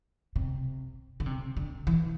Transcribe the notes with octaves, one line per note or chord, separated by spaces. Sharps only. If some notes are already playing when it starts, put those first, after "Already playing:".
C3
D3
C3
D3
E3